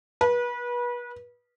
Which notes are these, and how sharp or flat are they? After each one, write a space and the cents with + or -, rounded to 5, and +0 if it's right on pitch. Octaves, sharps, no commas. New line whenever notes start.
B4 -30